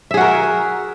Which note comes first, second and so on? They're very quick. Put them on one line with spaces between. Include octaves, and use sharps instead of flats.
E5 G#4 F#4 A#4